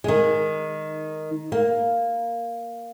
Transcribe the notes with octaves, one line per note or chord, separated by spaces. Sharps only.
D#3 G#3
A#3